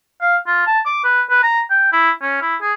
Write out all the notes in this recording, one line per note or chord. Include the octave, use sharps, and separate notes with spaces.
F5
F4
A5
D6
B4
B4
A#5
G5
E4
C#4
E4
G#4